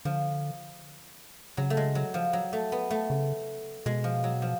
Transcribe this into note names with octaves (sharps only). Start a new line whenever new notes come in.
D3 F3
C#3 F#3
A3
G#3
F#3
F3
F#3
A3
B3
A3
C#3
B2 G#3
F3
F#3
F3